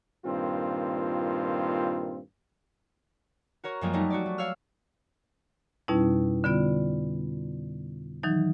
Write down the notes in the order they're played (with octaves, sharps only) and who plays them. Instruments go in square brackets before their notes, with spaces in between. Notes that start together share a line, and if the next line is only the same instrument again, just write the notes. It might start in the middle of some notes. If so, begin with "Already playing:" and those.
[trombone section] G2 A#2 D#3 C4 F4
[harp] F#4 A#4 C#5
F#2 F3 G3 G#3 A#3 F4
F#3 G3 A3 D#4
F#4 C#5 D5
A3
C#5 F5 E6 F6
[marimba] F2 B2 G3 C#4 D#4 E4
D3 G3 B3 F4 D5
D#3 E3 F#3 D#4